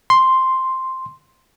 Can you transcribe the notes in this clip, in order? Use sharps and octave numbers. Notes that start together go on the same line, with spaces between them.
C6